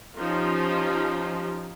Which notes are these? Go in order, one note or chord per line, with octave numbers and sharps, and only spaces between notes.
F3 C#4 D#4 F4 G4